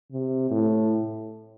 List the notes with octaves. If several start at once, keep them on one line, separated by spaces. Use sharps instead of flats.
C3
A2